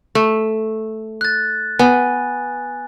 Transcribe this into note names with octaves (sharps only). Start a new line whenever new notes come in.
A3
F#6 A6
B3 G#5